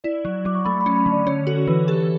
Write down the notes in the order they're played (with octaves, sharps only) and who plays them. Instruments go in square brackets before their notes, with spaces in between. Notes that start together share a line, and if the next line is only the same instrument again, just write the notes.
[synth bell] E4 [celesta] D5
[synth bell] F#3
[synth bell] F#3 [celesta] D6
[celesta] C#6
[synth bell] A3 [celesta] B5
[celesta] B5
[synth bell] C#4
[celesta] B5
[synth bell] D3
[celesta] D5
[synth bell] C#4 [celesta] C#5
[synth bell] F#4 [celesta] A4
[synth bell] E3 [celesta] B4
[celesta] G4 [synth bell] A4